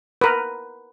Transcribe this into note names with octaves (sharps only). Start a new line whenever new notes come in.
A#4 B4